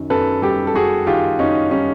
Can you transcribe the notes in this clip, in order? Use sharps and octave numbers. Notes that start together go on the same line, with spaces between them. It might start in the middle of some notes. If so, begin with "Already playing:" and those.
Already playing: F#2 D#3
F#2 A4 B4
G3 G4 A4
A4
F#2 F#4 G#4
D#3 F4 G4
F#2 C#4 D#4
G3 C#4 D#4